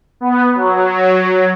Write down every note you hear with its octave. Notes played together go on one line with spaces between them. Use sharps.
B3
F#3